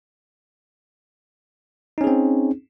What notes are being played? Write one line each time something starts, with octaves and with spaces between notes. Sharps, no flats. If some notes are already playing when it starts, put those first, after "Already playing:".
C4 C#4 D#4 G#4